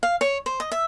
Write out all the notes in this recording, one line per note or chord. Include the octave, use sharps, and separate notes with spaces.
F5
C#5
C5
D#5
E5